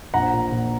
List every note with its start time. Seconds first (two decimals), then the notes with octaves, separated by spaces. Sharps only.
0.14 A#1 F#5 A#5
0.33 A#2
0.52 A#2